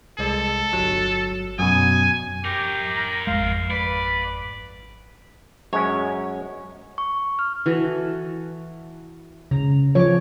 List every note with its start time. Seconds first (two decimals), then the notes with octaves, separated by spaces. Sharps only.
0.19 C2 G#3 A4
0.73 G1 F#3
1.59 F#2 B2 G#5 D#6
2.45 G4 A#4 C#5
2.97 A#5
3.27 G#1 F2 G#3 F5
3.71 B4 D5
5.73 F#2 G#3 C#4 C#5
6.98 C#6
7.39 F6
7.66 E3 F#4 A4
9.51 C#3 A#5
9.95 F3 C#5 C#6 D6